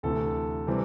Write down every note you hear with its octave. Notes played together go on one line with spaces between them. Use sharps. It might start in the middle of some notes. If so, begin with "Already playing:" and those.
D2 C3 E3 A4
C3 E3 G3 C4